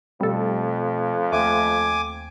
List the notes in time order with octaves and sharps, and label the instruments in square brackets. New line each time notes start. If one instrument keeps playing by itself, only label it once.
[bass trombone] F2 [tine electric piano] B2 A3 C4 [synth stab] G3 A4
[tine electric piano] D#2 G5 [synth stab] A3 [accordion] G#5 D6